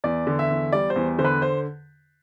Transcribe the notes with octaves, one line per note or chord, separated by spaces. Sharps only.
E2 D5
D3
E5
E2
G3 D5
C5
E2
D3 C5
B4
C5